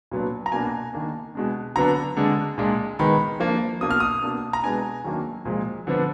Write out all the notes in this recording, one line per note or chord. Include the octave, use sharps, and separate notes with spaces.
A#2 F#3 B3 D4
A#5
B2 A#3 D4 G#5
D#3 A#3 D4
B2 G#3 D4
D3 F#3 B3 D4 A#5
D3 G#3 D4
A#2 G#3 D4
D#3 G#3 B3 B5
F3 A#3 D4
B2 A#3 D4 D#6
F6
D#6
B2 A#3 D4
A#5
B2 G#3 B3 D4 G#5
D#3 F#3 A#3 D4
A#2 F3 G#3
D3 F3 B3 D4